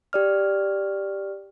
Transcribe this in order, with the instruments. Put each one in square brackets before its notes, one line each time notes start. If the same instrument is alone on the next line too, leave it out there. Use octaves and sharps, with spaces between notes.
[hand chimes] G4 D5 F6